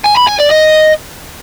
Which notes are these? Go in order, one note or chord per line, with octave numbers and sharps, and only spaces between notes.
G#5
B5
G#5
D5
D#5